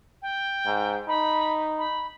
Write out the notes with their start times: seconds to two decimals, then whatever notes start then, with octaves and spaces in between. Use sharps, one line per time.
0.22 G5
0.66 G#2
1.08 D#4 B5
1.78 B5